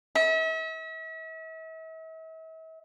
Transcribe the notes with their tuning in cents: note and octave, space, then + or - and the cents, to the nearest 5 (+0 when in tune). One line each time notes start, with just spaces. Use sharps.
E5 -40